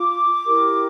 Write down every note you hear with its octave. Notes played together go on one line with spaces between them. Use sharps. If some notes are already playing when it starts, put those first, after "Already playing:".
Already playing: F4 D6
E4 G4 A#4